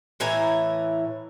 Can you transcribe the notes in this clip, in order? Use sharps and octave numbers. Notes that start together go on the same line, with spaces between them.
A2 E3 G#5 A#5